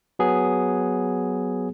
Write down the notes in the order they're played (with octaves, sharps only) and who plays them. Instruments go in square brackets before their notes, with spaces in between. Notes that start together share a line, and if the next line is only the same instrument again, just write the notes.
[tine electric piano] F#3 B3 G#4